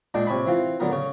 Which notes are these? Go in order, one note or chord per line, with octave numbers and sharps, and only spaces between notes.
A#2 G#3 D4 G5 A5
C3 C#5 G#5 A5 B5
E3 C4 F4
D3 F#3 B3 A#4
C#3 C#5